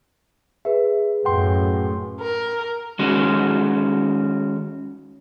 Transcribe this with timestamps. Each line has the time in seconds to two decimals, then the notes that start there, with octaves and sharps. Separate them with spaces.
0.65 G#4 B4 E5
1.25 F#2 A2 F#5 G5 C6
2.21 A#4
2.99 D#3 G#3 C#4 F#4